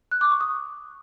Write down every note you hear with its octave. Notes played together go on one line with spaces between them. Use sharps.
F#6
D6
C#6
D#6